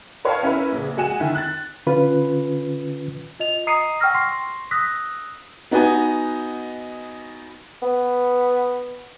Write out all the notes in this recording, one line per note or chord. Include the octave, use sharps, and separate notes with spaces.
B4 C#5 D#5 F5 G5 A5
C#4 E4 A#4 B4
A#1 C#3
G#3 F#4 F#5 G#5 E7
D#3 E4
F#6 A6
D3 C#4 F4 B4
F4 D#5 F7
D#5 A#5 D#6 C7 C#7 D#7
F#5 G5 C#6 E6 F6 A#6
C6 C#6 A#6 C7
D#6 E6 F#6 A#6 B6
B3 D#4 F#4 D#5 G#5
B3